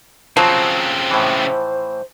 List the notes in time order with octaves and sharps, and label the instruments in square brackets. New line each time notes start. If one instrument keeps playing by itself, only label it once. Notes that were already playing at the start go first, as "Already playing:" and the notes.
[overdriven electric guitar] C#3 C4 [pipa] F3 [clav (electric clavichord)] F#3 C5
[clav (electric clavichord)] A2 E3 [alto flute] C5